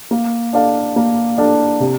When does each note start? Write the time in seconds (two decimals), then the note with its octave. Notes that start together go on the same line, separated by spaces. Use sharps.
0.11 A#3
0.53 D4 A4 D5 F5
0.96 A#3
1.38 D4 A4 D5 F5
1.80 C3